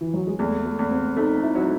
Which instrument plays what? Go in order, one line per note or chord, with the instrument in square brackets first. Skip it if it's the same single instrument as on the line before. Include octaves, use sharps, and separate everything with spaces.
[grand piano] E3
F#3
G#3
[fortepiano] E2 [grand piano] A3
[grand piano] A3
[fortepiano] E2
[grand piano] C4
[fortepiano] A3 [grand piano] D#4
[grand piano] E4
[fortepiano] F#3